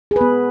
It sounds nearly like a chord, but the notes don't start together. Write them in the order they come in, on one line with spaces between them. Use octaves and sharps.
G#4 B4 B3